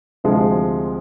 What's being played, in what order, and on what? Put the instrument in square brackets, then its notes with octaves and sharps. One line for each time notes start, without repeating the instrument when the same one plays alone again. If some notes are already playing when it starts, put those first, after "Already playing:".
[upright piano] D2 C3 F3 G#3